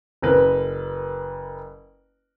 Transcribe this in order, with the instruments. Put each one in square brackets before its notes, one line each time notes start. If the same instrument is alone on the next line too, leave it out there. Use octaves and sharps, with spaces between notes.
[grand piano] F#1 A#4 B4